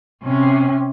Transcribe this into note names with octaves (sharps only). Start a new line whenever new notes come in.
C3 C#4